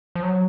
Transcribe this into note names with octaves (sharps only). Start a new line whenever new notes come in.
F3
F#3